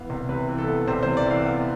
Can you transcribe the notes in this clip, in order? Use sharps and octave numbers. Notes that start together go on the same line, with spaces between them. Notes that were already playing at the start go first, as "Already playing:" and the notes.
Already playing: E3 B3 F5
C2
C3 B4
E3
A4
B3
C2 C5
C3 C5
D5
E3 F5
B3